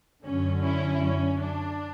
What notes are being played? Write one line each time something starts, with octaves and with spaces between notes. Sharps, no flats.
F#2 D3 F#3 C#4
C#4 E4
C#4
D4